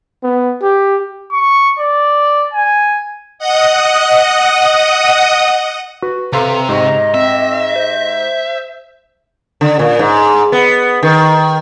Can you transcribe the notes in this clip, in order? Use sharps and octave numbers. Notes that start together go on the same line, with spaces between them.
B3
G4
C#6
D5
G#5
D#5 F#5 D#6
F#4 B4
C3 A4 B4 F5 A#5 C6
G#2 G4 D#5 C#6
C4 E5
C5
D3
A#2
G#2
B3
D#3